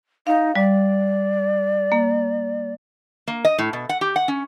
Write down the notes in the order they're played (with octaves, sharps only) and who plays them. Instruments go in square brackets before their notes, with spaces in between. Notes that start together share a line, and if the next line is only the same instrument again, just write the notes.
[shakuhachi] D#4 [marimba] F5
[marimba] G3 [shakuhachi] D5
[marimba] A#3
[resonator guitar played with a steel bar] A#3
D#5
A2
B2
F#5
G4
F#5
C#4